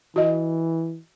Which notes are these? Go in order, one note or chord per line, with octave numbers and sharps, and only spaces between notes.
E3 F#4 D#5